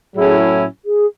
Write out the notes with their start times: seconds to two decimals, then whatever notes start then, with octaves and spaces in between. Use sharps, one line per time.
0.16 A2 F#3 C#4 E4 G#4
0.85 G#4